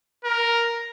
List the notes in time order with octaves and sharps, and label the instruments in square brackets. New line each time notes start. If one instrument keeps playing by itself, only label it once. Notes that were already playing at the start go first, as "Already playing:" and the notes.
[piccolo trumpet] A#4